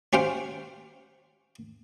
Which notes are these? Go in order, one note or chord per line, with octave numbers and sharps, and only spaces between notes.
C#4 G4 C5 F5 G5